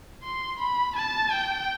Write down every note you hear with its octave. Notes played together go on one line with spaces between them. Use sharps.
C6
B5
A5
G5